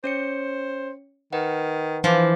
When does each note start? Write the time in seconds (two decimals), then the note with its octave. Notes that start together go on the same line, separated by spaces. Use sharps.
0.04 C#4 C5 C#5 C#7
1.33 D#3 B4 F#5
2.04 E3 F3 C5 F5 D6